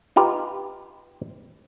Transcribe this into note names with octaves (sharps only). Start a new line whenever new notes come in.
D#4 F4 G4 B4 F5